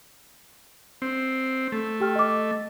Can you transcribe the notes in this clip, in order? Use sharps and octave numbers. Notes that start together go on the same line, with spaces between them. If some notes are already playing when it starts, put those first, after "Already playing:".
C4
A3
G4 G5 F6
D#5 D6